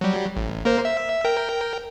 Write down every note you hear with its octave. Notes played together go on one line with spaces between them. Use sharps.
F#3 G3
A1
A#3 A#4 C5
E5
A#4 G5